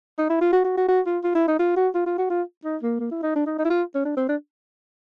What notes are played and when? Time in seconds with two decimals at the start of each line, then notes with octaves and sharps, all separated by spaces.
0.19 D#4
0.30 E4
0.41 F4
0.53 F#4
0.65 F#4
0.77 F#4
0.88 F#4
1.06 F4
1.24 F4
1.35 E4
1.48 D#4
1.59 F4
1.77 F#4
1.95 F4
2.06 F4
2.18 F#4
2.30 F4
2.65 D#4
2.83 A#3
3.00 A#3
3.11 E4
3.23 D#4
3.36 D4
3.47 D#4
3.59 D#4
3.65 E4
3.70 F4
3.95 C#4
4.05 D4
4.17 C4
4.29 D4